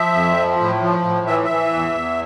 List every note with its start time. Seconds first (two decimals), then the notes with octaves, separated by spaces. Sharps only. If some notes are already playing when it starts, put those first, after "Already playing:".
Already playing: F3 E5
0.15 F2
0.37 F3
0.60 A2
0.82 F3
1.04 A2
1.27 E3 E5
1.44 E5
1.50 E3
1.73 E2
1.94 E2